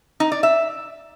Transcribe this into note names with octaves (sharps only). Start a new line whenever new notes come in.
D#4
D5
E5